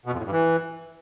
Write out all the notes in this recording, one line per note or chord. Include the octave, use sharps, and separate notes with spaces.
B2
F2
A2
G2
E3